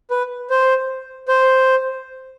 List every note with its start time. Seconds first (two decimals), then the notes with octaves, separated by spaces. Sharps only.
0.11 B4
0.50 C5
1.28 C5